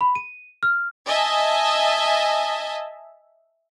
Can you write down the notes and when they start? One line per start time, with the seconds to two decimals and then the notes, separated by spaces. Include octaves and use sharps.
0.01 B5
0.15 D#7
0.63 F6
1.08 D#5 E5 G#5 A5